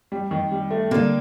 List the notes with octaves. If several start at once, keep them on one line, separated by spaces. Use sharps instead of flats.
G3
D#3
G3
A3
D3 G3 A#3 D4 A4